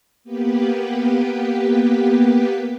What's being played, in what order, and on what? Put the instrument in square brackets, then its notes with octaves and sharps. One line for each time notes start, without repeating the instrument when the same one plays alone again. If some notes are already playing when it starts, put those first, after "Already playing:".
[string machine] A#3 B3 G4 B4